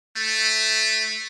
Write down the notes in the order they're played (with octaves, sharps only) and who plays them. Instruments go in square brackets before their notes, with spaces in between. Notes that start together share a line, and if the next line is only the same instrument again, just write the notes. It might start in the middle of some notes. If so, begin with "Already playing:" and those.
[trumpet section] A3